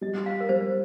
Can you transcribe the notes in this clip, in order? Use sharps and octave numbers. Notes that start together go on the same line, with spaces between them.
G3 D#5
F5
A#4
G3 C5